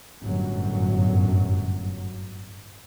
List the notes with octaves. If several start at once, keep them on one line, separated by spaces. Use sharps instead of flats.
G1 F#2 A2 F#3